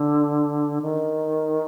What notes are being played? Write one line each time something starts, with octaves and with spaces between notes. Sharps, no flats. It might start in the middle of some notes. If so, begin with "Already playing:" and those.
Already playing: D3
D#3